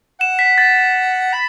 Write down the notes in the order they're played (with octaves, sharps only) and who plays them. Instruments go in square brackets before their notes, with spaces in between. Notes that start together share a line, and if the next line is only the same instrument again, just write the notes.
[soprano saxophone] F#5 [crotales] E7
[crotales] B6
A6
[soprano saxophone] B5